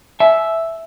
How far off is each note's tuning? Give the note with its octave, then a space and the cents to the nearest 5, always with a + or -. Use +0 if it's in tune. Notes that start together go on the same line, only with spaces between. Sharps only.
E5 +0 G#5 +40